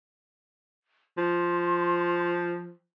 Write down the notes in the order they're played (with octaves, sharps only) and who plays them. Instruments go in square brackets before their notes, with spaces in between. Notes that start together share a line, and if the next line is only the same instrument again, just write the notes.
[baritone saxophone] F3 [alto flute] C6